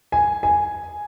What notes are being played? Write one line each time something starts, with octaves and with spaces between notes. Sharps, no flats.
G#5
G#5